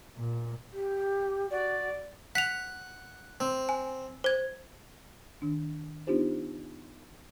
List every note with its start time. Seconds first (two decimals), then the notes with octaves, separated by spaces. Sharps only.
0.17 A#2
0.73 G4
1.51 F#4 D5
2.35 F#5 B6 F7
3.40 C4
3.69 G#5
4.24 C5 G#6
5.42 D#3 D4
6.07 B3 D4 D#4 F4 G4 C5